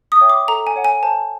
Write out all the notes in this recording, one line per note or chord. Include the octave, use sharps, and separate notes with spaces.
D#6
C#5 E5 G5
D6
A4 A#5
G#5
C#5 F#5
G#5
C5 A5